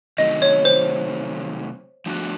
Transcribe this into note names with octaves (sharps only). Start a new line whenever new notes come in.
C3 D#3 F#3 A3 D#5
C#5
C5
F3 A3 D4 F#4